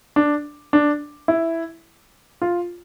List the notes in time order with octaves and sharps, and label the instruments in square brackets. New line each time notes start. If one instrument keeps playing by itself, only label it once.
[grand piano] D4
D4
E4
F4